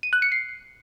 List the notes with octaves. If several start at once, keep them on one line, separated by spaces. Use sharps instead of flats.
D#7
F#6
C#7
C7